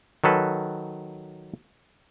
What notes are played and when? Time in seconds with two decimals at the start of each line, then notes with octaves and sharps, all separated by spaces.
0.24 D#3 F#3 A4 B4